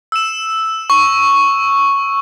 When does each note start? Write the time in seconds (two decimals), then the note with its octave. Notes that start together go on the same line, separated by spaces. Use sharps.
0.12 E6 E7
0.90 C#6